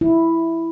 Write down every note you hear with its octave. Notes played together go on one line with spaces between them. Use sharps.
E4